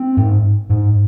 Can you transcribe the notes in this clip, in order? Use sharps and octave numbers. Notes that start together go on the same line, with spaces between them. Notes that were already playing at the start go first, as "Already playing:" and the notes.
Already playing: C4
G#2
G#2